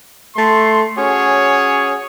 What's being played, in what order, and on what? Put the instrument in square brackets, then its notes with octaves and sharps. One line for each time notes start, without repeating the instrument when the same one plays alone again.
[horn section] A3 C6
C#4 F#4 G#4 C#5